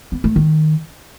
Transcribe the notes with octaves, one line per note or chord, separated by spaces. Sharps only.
B3
A3
D#3